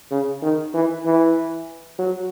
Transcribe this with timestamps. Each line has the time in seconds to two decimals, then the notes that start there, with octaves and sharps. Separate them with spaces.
0.11 C#3
0.42 D#3
0.74 E3
1.05 E3
1.99 F#3